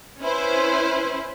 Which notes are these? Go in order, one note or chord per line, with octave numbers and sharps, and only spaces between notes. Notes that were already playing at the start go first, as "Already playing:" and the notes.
C#4 E4 B4 C5